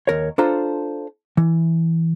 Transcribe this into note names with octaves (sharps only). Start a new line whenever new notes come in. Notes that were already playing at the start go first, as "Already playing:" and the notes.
D#2 A#4 C#5
D4 F4 A4 C5 A#5
E3